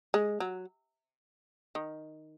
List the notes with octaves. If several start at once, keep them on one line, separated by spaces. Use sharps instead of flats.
G#3
F#3
D#3